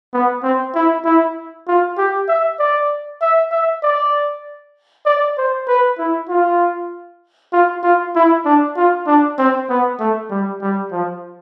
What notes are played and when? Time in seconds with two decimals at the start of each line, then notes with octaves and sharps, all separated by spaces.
0.13 B3
0.43 C4
0.75 E4
1.05 E4
1.68 F4
1.98 G4
2.28 E5
2.59 D5
3.21 E5
3.52 E5
3.83 D5
5.06 D5
5.38 C5
5.68 B4
5.98 E4
6.29 F4
7.53 F4
7.83 F4
8.15 E4
8.45 D4
8.77 F4
9.07 D4
9.38 C4
9.69 B3
10.00 A3
10.30 G3
10.61 G3
10.92 F3